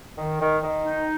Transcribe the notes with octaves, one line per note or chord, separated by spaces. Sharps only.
D#3
D#3
D#3
D#4